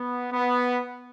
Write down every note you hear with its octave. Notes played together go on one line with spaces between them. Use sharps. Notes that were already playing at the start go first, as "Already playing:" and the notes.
Already playing: B3
B3